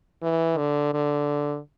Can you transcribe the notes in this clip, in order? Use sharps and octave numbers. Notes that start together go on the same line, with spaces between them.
E3
D3
D3